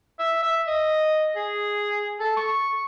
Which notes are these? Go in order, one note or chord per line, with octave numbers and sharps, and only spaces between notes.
E5
E5
D#5
G#4
A4
C#6